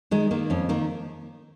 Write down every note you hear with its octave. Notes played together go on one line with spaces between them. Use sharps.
D#3 G#3
D#3 A#3
F2 C#4
D#3 A#3